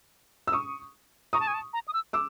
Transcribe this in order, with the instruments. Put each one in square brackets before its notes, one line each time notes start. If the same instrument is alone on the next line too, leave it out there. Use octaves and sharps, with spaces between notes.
[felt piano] E6
C#6 D#6
[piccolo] A#5 [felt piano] C#6 D#6
[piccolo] A5
G#5
A5
A#5
D#6
E6
[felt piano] D6 E6